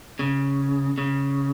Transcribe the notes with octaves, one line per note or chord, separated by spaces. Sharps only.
C#3
C#3